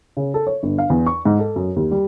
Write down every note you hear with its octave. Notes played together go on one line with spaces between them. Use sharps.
C#3
A4
C#5
G1
F5
E2
C#6
G#2
A4
F#2
D#2
G3